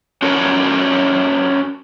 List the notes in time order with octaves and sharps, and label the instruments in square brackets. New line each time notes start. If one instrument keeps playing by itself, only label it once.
[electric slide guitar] C#4 D4 F#4 A4 A#4 C#5